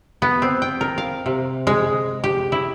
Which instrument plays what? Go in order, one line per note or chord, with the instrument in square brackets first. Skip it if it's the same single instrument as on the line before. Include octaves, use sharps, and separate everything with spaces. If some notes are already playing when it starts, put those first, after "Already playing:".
[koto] B3
C4
G5
A#4
F5
C3
G#3
G4
E4